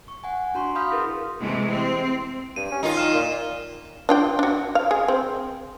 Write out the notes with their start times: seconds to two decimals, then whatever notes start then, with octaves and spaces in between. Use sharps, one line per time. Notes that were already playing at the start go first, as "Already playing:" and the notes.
0.08 C#6
0.24 F#5 G#5
0.54 D4 F#4 A#5 C6 C#6
0.75 F5 B5 C6 D#6 F6 G6
0.91 E4 G#4 A#4 B4
1.40 C3 E3 G#3 A3
1.70 C4
2.56 G2 D#7
2.71 C#4
2.83 D#3 D#4 F4
2.97 F6 E7
3.14 A#2
4.09 D4 F4 G5
4.39 D4 F#4
4.75 F5
4.91 G#4
5.08 C4